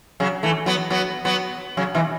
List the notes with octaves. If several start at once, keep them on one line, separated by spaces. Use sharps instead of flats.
C#3 F#3
E3 A3
F#3 B3
F#3 B3
F#3 B3
C#3 F#3
B2 E3